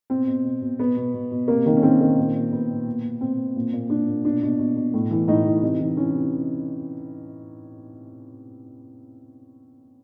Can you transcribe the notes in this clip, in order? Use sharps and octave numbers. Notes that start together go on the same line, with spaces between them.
B2 C4
B2
B2
B2
B2 B3
B2
B2
B2
C3 A#3
D#3 A#3
C#4
D#3 C4
D#3
A#2
A#2
A#2 B3
A#2
B2
B2
B2 C4
B2
A#2
A#2
A#2 D4
A#2
B2 D4
B2
B2
B2
A2
E3
A2 D#4
E3
C3 D#4
E3
E3 C#4
C3